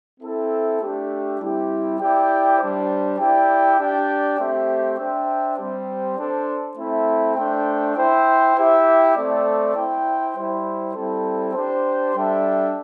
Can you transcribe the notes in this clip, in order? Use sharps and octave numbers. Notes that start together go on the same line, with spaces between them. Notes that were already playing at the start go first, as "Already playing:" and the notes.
C4 E4 A4 E5
A3 D4 G4
G3 C4 E4 G4
E4 G4 D5 G5
G3 D4 C5
E4 G4 D5 G5
D4 G4 D5 G5
A3 C4 G4 C5 E5
D4 C5 E5 G5
G3 C4 G4 C5
D4 A4 C5
A3 C4 E4 A4 E5
A3 D4 C5 G5
E4 C5 E5 G5
E4 G4 E5 G5
A3 C4 A4 D5
E4 C5 G5
G3 E4 C5 G5
G3 C4 E4 A4
D4 G4 C5
G3 D4 A4 E5 G5